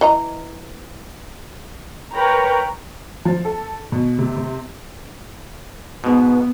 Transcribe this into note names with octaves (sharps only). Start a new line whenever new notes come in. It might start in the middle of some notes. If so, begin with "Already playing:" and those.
E3 D#5 A#5
A#4 B4 C#5 G5 A#5 B5
F3
A4
B2
C3
C3
G#2 B2 B3